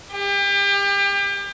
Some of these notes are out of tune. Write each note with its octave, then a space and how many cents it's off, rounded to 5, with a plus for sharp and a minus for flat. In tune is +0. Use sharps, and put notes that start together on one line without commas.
G4 +35